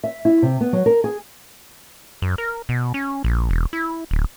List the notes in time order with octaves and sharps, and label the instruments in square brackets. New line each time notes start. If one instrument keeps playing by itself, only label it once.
[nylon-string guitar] E5
E4
C3
B3
F#3
A#4
G#4
[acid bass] F#2
A#4
B2
C#4
A#1
E1
E4
D1